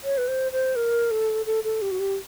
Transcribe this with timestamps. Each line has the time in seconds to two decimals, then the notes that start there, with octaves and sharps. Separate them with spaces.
0.04 C#5
0.18 B4
0.28 C5
0.52 C5
0.76 A#4
1.11 A4
1.46 A4
1.64 A4
1.82 G4
1.91 F#4
2.00 G4